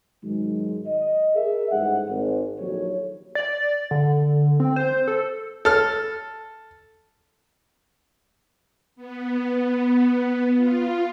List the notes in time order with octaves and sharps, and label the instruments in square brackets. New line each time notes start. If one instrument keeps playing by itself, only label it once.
[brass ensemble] G#2 D#3 F#3 G#3
D#5
G#4 A#4 E5
A1 G#2 G3 F#5
G#1
A#1 D#2 F#3 A4 C#5
[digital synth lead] D5
D3
C4
C5
A4
[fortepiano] A4 F6
[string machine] B3
F4